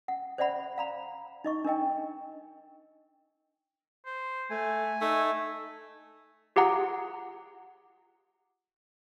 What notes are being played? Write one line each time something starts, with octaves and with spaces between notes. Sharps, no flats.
F#5
C5 D5 E5 F#5 B5
F5 A#5 B5
D#4 D#5 C#6
D4 A#4 D#5 G5
C5
A3 G#5
A3 D#4
F4 G4 G#4 F#5 A#5